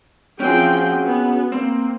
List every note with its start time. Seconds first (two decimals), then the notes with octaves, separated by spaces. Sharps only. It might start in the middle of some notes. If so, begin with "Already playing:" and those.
0.40 F3 C4 C#4 F#4 G#4 G5
1.04 B3
1.52 A#3 C4